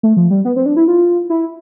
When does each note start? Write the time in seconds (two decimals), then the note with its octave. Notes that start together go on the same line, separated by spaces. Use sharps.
0.03 A3
0.17 F3
0.30 G3
0.45 B3
0.56 C4
0.66 D4
0.76 E4
0.88 F4
1.30 E4